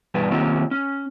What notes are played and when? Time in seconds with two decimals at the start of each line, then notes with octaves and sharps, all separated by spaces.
0.14 E2 G2 B2 D4 B4
0.31 D#3 A#3 C4 C#4 F4 G4
0.71 C#4